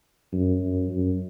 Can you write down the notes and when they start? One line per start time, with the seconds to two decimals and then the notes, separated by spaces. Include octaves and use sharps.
0.32 F#2
0.61 F#2
0.90 F#2